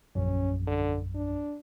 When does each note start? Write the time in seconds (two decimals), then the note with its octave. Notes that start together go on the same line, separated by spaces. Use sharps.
0.15 A#1 F#2 C#4
0.67 D3
1.15 D4